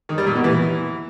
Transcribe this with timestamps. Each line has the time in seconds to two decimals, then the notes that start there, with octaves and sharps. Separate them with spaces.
0.09 D#3
0.18 G3
0.27 A#2
0.35 B2
0.44 E3